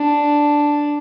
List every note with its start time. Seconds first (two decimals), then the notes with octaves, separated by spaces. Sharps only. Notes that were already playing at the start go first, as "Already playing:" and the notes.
Already playing: D4